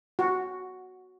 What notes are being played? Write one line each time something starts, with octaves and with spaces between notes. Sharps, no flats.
F#4